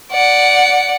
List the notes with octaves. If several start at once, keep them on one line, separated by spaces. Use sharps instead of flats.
D5 F#5